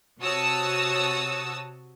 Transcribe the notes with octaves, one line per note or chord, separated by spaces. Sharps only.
C3 F#4 C#5 A5 D#6 E6